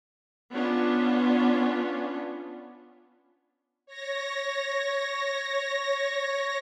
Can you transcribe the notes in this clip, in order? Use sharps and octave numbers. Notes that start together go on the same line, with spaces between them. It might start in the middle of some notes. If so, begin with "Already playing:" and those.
B3 C#4 D4 F4
C#5 A#6